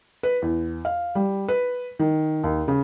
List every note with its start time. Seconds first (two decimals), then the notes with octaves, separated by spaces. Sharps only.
0.23 B4
0.42 E2
0.85 F5
1.15 G3
1.48 B4
1.99 D#3
2.44 D#2
2.68 C#3